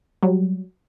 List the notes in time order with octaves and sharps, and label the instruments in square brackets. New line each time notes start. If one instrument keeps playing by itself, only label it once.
[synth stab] F#3 G3